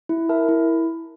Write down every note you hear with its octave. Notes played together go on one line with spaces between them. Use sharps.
E4
A#4 E5 A5
E4